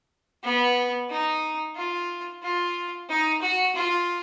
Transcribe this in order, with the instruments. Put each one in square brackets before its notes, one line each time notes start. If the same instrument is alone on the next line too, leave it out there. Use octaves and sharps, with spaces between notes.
[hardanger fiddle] B3
D#4
F4
F4
D#4
F#4
F4